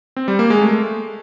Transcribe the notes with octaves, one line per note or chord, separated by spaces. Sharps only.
C4
G3
A#3
G#3
A3